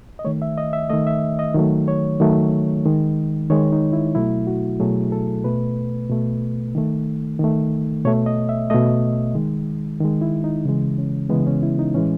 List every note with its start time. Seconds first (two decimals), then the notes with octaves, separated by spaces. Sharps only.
0.19 D#5
0.24 D#3 A3 C#5
0.42 E5
0.58 D#5
0.73 E5
0.90 D#3 A3 D#5
1.07 E5
1.39 D#5
1.54 D#3 F#3 A3
1.88 C#5
2.20 D#3 F#3 A3
2.85 D#3 G#3
3.50 D#3 G#3 C#5
3.72 D#4
3.93 E4
4.15 B2 F#3 A3 E4
4.47 F#4
4.80 B2 F#3 A3 G#4
5.12 A4
5.44 B2 A3 B4
6.10 B2 A3
6.75 D#3 A3
7.39 D#3 A3
8.05 B2 A3 C#5
8.26 D#5
8.49 E5
8.70 B2 A3 D#5
9.35 D#3 G#3
10.00 D#3 G#3
10.21 E4
10.44 D#4
10.65 C#3 E3 G#3
10.98 C#4
11.29 C#3 E3 G#3 B3
11.47 C#4
11.63 E4
11.79 D#4
11.94 A2 E3 G#3 C#4